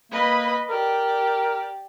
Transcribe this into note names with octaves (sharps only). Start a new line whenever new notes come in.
A#3 B4 D#5 B5
G4 A#4 D5